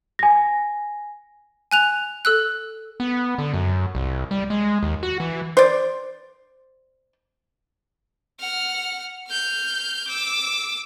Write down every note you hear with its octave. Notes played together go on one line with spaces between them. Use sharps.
G#5 A#6
G#5 F#6 F7
A4 E6 F#6
B3
D3
F#2
C2
G3
G#3
D#2
F#4
E3
C5 D5
F#5 F6
F6 G6
D6 E6